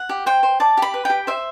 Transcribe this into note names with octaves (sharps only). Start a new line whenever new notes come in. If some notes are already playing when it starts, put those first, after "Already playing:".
Already playing: F#5
G4
C5 G5
C5
D5 A5
G4 B5
B4
G4 G5
C5 E5